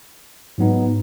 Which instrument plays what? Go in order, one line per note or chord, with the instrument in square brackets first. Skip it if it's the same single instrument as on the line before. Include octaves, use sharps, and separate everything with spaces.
[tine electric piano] G#2 F#3 B3 D#4